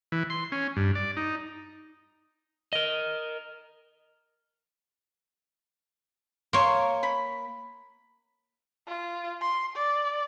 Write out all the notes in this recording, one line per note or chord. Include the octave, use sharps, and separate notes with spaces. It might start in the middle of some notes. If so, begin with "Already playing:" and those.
E3
C6
C#4
G2
D5
D#4
A#4 D#5
A#3 C#5 C6 C#6
B5
F4
C6
D5